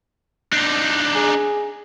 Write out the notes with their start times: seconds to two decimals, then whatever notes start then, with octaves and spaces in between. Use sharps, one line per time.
0.52 D4 D#4
1.15 G#4